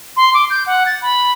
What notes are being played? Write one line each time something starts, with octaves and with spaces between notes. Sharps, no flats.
C6
D6
G6
F#5
A6
B5